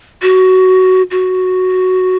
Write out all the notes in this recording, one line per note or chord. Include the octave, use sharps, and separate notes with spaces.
F#4
F#4